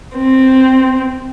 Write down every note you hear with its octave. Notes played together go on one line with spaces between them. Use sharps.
C4